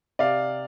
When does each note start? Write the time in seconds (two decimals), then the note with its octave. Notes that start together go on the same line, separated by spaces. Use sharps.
0.19 C3 D5 F5